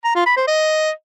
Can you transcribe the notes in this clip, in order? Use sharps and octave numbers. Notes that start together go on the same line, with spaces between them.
A#5
F4
B5
C5
D#5